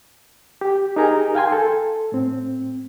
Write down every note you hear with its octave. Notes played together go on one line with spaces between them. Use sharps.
G4
D#4 G4 G#4 A#4 G#5 A#5
F5 G5 G#5 C6
A4
A2 C4